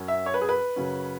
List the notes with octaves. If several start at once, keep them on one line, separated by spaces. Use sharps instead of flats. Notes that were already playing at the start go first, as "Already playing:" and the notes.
Already playing: F#2 F#3 C#4
E5
C#5
B4
G#4
B4
F#2 C#3 F#3 C#4